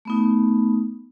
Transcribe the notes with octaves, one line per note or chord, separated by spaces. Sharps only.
A3 B3 D#4